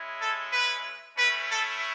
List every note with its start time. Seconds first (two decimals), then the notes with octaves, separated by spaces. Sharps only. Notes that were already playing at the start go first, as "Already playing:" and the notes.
Already playing: G#3 C#4 E4
0.20 A4
0.53 B4
1.17 A3 C#4 E4 B4
1.50 A4